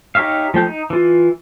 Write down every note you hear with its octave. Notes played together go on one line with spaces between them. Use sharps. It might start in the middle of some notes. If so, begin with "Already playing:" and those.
D#4 G4 C#5 E5 F5
F3 A3 G5 G6
D#4
E3 F4